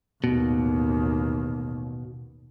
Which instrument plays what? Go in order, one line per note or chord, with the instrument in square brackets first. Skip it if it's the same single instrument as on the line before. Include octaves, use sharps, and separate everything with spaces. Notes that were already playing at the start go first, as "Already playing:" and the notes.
[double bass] A1 D#2 [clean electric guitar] B2